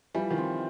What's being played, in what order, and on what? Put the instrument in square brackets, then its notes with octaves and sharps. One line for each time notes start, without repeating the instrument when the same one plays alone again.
[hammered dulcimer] E3 [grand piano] F3 G3
[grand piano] D#3 F3
[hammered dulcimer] C4